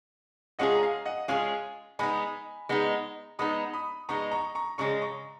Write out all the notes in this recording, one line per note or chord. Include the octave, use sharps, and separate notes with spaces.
G#3 C#4 F4 G#4 D#5 F#5
A#5
F5 G#5
D#5 F#5
G#3 C#4 F4 G#4 F5 G#5
G#3 B3 D#4 G#5 B5
G#3 B3 D#4
G#3 B3 D#4 B5 D#6
B5 D#6
G#3 B3 D#4 A#5 C#6
A#5 C#6
A#5 C#6
C#3 G#3 C#4 A#5 C#6
A#5 C#6